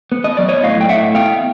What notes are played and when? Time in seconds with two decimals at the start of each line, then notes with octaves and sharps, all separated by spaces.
0.12 B3
0.24 D#5
0.37 F#3 D5
0.49 C#5 D#5
0.63 A2 D#5 F5
0.81 G5
0.89 A2 E5 F#5
1.15 B3 F5 G5